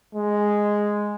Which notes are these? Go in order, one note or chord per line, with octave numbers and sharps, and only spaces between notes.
G#3